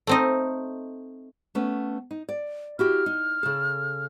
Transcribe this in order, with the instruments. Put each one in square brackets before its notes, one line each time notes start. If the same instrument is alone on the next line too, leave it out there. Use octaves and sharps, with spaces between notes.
[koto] A3 C4 D#4
[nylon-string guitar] A3 B3 C#4
D#4
D5
[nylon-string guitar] E4 F#4 G4 [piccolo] F6
[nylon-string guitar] D#4
C#3 A4